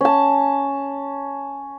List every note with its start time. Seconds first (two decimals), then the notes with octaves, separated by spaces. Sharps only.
0.01 C#4 A5